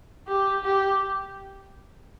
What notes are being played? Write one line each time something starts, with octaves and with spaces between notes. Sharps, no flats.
G4
G4